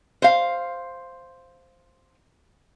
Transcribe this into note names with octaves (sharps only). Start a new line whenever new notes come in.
C5 F5